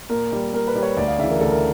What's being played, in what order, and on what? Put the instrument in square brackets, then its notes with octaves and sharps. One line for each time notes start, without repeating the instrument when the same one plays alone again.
[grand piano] A#2 A#4
G3
A#2 A#4
B4
G3
C#5
D2 D5
F5
C#3 E3 E5
A#4
D2 A4
A#4